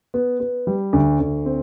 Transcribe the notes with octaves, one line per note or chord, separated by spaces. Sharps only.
B3
B3
G3
D2
D2
C4